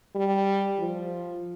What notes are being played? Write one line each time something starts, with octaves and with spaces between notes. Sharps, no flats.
G3
F3